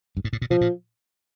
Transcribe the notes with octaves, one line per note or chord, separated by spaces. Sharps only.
G2
G#2
A2
A#2
B2 F3
A#2